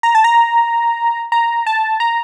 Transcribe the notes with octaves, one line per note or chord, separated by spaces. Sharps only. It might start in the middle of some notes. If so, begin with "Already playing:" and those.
A#5
A5
A#5
A#5
A5
A#5